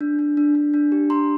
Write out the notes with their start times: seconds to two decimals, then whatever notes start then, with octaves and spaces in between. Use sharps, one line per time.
0.01 D4
0.19 D4
0.37 D4
0.55 D4
0.74 D4
0.92 G4
1.10 D4 A#5 C6